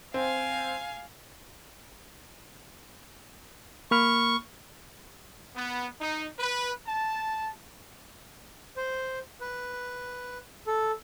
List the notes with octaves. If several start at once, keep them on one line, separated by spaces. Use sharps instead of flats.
C4 F5 G#5
A#3 B5 C#6 F6
B3
D#4
B4
A5
C5
B4
A4